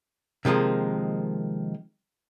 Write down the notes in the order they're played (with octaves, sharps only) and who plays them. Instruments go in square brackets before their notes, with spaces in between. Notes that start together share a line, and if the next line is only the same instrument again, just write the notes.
[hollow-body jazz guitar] C3 D#3 F3 G#3 A#3